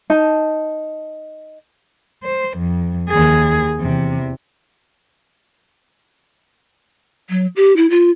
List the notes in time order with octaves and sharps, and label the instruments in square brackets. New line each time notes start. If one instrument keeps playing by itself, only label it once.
[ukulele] D#4 A5
[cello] C5
F2
D#2 G#4
E2 C3
[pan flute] F#3
G4
E4
F4